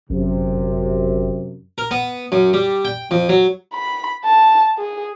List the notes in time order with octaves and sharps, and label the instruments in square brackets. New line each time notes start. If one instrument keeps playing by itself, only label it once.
[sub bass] G1 [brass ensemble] F#2 C3
[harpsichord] A#4
B3
F#2
G3
G5
F2
F#3
[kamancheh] B5
A5
G#4